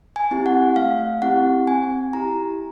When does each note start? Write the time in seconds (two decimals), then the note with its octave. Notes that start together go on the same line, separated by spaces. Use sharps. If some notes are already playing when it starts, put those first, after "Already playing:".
0.16 G#5
0.31 C4 E4 G4
0.46 F#5
0.76 A3 F5
1.22 C4 E4 G4 F#5
1.67 C4 G#5
2.13 E4 G4 A#5